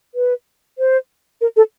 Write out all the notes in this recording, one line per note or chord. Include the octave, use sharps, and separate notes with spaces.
B4
C5
A#4
A4